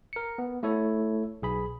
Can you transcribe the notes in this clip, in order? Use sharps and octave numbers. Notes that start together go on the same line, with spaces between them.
A#4 C#7
B3
A3 E4 A4 C#5
B1 G#4 B5